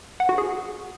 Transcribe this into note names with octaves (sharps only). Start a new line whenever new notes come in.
F#5
F#4
G#4